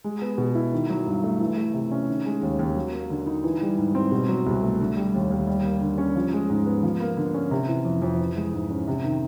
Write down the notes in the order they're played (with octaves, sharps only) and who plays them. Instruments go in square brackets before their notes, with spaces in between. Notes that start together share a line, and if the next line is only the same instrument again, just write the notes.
[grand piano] G#3
B3
B2
E4
D#3
F#3
G2
A3
E3
A3
C3
C#4
D#3
G#3
D#2
D#2
F#3
A#3
D3
D#4
E3
G3
G#2
C4
B2
F#3
C2
A3
D3
G3
D#2
D#2
G3
A#3
D3
C#4
F3
G#3
G#2
B3
F3
A#3
D3
C#4
C3
E3
F2
F2
E3
G#3
G#2
C#4
C3
D#3